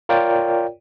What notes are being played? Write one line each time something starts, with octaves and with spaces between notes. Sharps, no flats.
F4 A#4 C#5 D5 G5